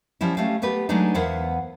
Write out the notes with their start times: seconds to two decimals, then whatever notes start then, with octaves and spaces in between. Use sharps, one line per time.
0.21 F3 G3 C#4 E4
0.37 A3 C#4 G4 F5
0.62 A3 B3 G4 B4
0.89 F#3 G#3 A3 B3 D4 D#4
1.15 E2 B3 A#4 C5 F5 F#5